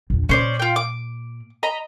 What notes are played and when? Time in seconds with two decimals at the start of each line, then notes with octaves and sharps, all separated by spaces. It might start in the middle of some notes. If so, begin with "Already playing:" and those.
0.10 A#1 E2
0.29 A#2 C#4 C5 D5
0.59 F4 G5
0.76 D6
1.63 D#5 A#5 B5